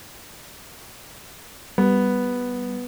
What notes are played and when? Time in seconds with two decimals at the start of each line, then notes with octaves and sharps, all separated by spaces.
1.78 G3 B3